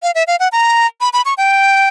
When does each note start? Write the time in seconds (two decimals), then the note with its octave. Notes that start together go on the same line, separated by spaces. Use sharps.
0.03 F5
0.15 E5
0.27 F5
0.40 F#5
0.52 A#5
1.01 B5
1.13 B5
1.25 C#6
1.38 G5